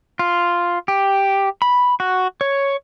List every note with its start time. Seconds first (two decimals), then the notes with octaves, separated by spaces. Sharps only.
0.19 F4
0.88 G4
1.62 B5
2.00 F#4
2.41 C#5